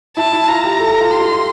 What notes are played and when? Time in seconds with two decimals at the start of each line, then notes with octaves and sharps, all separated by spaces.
0.17 E4 A5
0.32 E4
0.48 F4 A#5
0.64 G4
0.79 A4
0.90 A4
1.01 F4
1.10 G4 C6
1.21 F4
1.32 F4